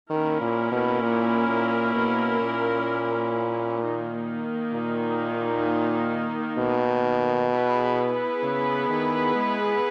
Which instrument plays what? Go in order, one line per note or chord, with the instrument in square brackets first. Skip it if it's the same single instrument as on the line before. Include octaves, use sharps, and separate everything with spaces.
[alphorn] D#3 [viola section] A#3 C#4 E4 A#4
[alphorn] A#2
B2
A#2
A#2
B2
A#2
[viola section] D#3 A#3 D#4
[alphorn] A#2
B2
[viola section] B3 E4 G#4 B4
[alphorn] C#3
D#3
G#3